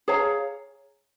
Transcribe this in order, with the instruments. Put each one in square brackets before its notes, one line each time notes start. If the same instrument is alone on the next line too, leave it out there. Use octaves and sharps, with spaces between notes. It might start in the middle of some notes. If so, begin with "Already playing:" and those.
[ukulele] G#4 C#5 F5 A#5